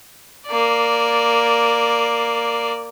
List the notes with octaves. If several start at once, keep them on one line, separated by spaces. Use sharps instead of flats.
A#3 D5